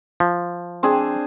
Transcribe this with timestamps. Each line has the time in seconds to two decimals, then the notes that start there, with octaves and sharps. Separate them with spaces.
0.20 F3
0.83 C4 D4 G#4